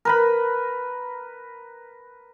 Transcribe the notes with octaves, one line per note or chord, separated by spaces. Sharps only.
A#4 B4 B5